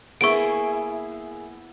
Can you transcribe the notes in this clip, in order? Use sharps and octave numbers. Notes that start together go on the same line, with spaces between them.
A#3 B3 E4 G#4 C#6 D7